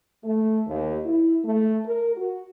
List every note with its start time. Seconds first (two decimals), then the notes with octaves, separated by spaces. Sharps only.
0.24 A3
0.67 D#2
1.05 E4
1.44 A3
1.86 A#4
2.16 F#4